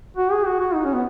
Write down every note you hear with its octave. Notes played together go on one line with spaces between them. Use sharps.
F#4
G#4
F#4
F#4
D#4
C#4
B3